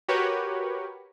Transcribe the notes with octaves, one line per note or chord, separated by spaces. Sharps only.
F#4 G4 A#4 B4 C#5